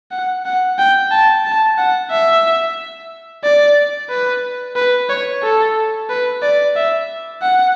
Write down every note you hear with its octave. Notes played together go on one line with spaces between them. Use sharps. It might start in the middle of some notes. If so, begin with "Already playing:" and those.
F#5
F#5
G5
A5
A5
F#5
E5
D5
B4
B4
C#5
A4
B4
D5
E5
F#5